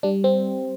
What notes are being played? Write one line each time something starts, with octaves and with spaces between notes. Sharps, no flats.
G3 D4
C4